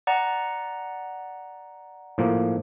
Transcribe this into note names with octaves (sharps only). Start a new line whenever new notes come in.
D5 F#5 A#5
A2 F3 A#3